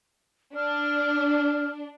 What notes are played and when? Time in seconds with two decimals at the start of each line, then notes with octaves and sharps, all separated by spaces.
0.56 D4 F6